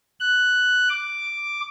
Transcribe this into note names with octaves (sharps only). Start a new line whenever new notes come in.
F#6
D6